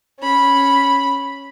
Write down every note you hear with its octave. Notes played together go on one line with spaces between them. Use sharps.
C#4 B5